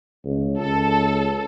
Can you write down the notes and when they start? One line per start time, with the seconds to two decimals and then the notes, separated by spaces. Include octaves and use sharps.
0.25 C#2
0.59 C#2 A4